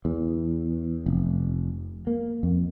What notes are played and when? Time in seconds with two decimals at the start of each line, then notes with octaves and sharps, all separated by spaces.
0.05 E2
1.06 F1
2.07 A#3
2.43 F2